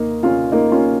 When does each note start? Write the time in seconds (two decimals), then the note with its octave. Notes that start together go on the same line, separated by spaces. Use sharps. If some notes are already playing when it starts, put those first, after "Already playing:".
Already playing: D#2 A#3 D#4
0.23 C#4 F4
0.52 A#3 D#4
0.72 C#4 F4